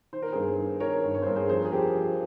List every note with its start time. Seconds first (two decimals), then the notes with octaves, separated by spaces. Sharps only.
0.13 D#3 C5
0.22 A#4
0.33 G2 G#4 C5
0.59 D#3
0.80 D#3 A#4 C#5
1.03 G2
1.15 C#5
1.22 C5
1.26 G2 A#4
1.36 G#4 C5
1.49 F2 G#4 C5
1.65 G#4
1.72 F2 G4 A#4
1.95 F3